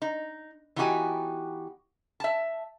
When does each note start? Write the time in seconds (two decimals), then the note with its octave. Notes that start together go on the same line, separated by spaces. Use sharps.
0.02 D#4
0.76 E3 B3 D#4 F#4 G4 G#5
2.20 E5 A5